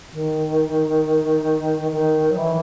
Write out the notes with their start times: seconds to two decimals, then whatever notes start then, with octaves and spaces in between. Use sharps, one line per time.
0.13 D#3
1.91 D#3
2.30 F#3
2.36 E3